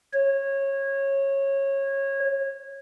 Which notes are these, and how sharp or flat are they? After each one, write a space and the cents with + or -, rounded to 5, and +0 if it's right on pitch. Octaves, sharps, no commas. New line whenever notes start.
C#5 -20